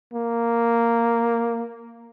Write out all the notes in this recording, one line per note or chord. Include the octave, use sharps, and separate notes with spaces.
A#3